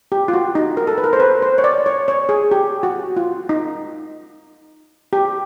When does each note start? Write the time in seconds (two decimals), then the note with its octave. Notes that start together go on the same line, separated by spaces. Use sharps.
0.12 G4
0.28 F4
0.33 F#4
0.55 D#4
0.77 A#4
0.87 A4
0.98 B4
1.04 A#4
1.13 C5
1.20 B4
1.42 C5
1.58 C#5
1.64 D5
1.86 C#5
2.08 C#5
2.29 G#4
2.51 G4
2.83 F#4
3.16 F4
3.49 D#4
5.13 G4